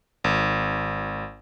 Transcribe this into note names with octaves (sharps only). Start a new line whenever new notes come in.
G#1